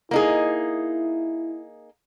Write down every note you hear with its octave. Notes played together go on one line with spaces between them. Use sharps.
A#3 D#4 E4 G#4